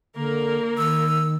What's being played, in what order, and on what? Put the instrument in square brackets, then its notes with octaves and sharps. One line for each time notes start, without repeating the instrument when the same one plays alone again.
[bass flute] D3 [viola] A#3 A#4
[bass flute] D#3 [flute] E6